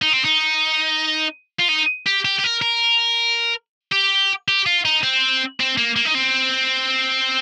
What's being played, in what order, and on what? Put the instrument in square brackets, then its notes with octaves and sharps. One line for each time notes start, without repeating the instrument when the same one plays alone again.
[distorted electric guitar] D#4
C4
D#4
F4
D#4
G4
G4
G4
A#4
A#4
G4
G4
F4
D#4
C4
C4
A#3
A#3
D#4
C4